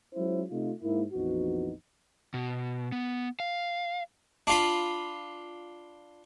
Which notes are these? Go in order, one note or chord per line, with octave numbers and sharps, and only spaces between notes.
F#3 G#3 C#4 E4 F4 C5
C3 A3 D#4 F4
G#2 A#3 E4
A#1 F2 E3 B3 D#4 F#4
B2
B3
F5
D4 F4 B5